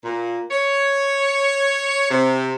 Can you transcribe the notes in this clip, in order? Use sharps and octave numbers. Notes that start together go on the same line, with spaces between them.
A#2
C#5
C3